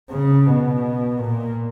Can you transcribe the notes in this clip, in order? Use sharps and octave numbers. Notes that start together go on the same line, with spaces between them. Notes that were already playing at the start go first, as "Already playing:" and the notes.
C#3
B2
A#2